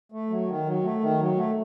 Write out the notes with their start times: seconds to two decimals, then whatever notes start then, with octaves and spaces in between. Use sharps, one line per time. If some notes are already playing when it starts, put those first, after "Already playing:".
0.12 A3
0.30 F#3
0.48 D#3
0.66 F#3
0.83 A3
1.00 D#3
1.19 F#3
1.36 A3